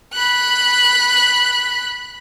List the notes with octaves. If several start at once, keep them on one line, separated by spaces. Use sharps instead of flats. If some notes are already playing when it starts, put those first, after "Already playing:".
B5 F#6